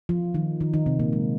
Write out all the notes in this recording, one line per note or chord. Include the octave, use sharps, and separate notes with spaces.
F3 F4
D#3 D#4
D#3 D#4
D#3 D#4
C3 C4
A#2 A#3
G#3